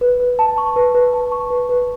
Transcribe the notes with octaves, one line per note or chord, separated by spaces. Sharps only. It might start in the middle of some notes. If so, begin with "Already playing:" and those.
B4
B4
A5
C#6
B4
B4
A5
C#6
B4
B4